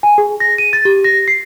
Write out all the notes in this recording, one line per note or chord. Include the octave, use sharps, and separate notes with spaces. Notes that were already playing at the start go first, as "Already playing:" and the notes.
G#5
G#4
A#6
D#7
A6
G4
A#6
C7